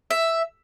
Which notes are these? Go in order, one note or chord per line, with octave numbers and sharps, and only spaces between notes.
E5